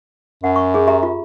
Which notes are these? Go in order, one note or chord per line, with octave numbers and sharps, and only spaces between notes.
F#2 F#5
C#6
C#4 G#4
G4 E5 A#5
F4